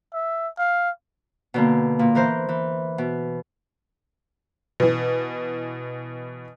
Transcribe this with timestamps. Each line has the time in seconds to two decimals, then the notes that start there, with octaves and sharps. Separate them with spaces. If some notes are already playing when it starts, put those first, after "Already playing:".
0.13 E5
0.58 F5
1.54 B2 D3 A#3
1.99 A#2
2.15 E3 A#4 C5
2.49 E3
2.98 B2
4.80 B2 E3